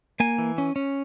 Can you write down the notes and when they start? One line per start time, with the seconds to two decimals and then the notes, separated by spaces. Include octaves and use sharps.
0.20 A#3 G#5
0.38 E3
0.58 C#4
0.76 C#4